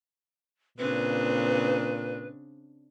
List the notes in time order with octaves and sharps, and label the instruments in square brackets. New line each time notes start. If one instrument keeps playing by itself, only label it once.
[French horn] A#2 [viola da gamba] C#3 C4 D4 [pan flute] B4